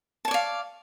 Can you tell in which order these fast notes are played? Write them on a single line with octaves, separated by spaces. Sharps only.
A5 C#5 D5 F5